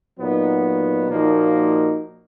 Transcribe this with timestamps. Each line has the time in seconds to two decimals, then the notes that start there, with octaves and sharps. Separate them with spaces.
0.19 A#2 F#3 B3 D#4
1.09 A#2 F3 A#3 D#4 F#4